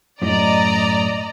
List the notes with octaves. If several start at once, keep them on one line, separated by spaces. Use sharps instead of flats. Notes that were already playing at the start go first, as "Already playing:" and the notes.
F#2 A2 D5 D#5 A#5